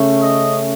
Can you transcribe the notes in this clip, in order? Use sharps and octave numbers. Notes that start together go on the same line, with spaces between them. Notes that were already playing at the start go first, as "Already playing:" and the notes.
Already playing: C#3 A3 C#4
D#5